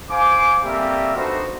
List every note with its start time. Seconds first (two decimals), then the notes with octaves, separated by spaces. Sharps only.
0.11 C5 F5 G#5 D6
0.64 G3 A3 A#3 C4 G4 E5
1.16 B3 D4 D#4 F#4 A4 C5